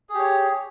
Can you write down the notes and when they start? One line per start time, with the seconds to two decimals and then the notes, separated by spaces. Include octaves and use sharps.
0.09 G#4
0.14 G4
0.19 C#5